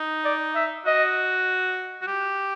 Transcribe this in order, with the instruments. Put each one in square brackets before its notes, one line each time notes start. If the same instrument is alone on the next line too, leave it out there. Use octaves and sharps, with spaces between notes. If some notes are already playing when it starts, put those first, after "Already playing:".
Already playing: [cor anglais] D#4
[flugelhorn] D5
E5
[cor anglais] F#4 [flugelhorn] D#5
[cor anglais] F#4
G4